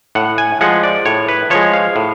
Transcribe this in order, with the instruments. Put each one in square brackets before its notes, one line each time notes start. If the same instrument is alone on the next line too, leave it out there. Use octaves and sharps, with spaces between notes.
[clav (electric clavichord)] A2 F#5
G#5
F3 G#3 F#5
D5
A2 C#5
B4
F3 G#3 C#5
F5
A2